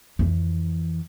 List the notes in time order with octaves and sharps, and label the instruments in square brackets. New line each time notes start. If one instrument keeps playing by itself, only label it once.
[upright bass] F2 E3